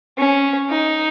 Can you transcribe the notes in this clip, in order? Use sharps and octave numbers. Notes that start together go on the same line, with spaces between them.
C#4
D#4